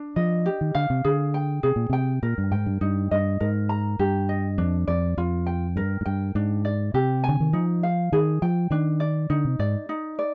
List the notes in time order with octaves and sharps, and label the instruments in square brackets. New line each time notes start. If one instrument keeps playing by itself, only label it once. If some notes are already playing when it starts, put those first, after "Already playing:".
Already playing: [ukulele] D4
[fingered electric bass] F3 [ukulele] D#5
[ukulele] G4
[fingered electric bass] D#3
[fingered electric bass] D3 [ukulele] F5
[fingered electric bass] C3
[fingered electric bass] D3 [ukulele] G#4
[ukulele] G5
[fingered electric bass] C3 [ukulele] G#4
[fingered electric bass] A#2
[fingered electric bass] C3 [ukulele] G5
[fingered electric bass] A#2 [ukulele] A#4
[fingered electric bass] G2
[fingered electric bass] G#2 [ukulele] G5
[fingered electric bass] G2
[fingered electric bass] G2 [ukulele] D#4
[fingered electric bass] G2 [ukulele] D#5
[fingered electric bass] G#2 [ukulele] A#4
[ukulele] A#5
[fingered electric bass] G2 [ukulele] G4
[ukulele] D#5
[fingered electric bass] F2 [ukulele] D4
[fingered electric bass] F2 [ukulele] D5
[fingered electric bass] F2 [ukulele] F4
[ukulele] G5
[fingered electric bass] G2 [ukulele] A#4
[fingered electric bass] G#2
[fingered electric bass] G2 [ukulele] G5
[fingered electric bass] G#2 [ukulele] D4
[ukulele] D5
[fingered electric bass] C3 [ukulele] G4
[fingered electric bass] D3 [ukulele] G#5
[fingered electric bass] D#3
[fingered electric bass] F3 [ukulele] D#4
[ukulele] F5
[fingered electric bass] D#3 [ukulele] G#4
[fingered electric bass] F3 [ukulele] G5
[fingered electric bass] D#3 [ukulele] D4
[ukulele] D5
[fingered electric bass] D3 [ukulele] D#4
[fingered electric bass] C3
[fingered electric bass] G#2 [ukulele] D5
[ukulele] D#4
D5